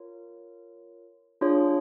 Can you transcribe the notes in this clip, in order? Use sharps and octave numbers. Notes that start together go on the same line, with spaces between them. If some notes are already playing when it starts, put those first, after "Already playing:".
Already playing: F4 A#4 C#5
D4 F4 G#4 C#5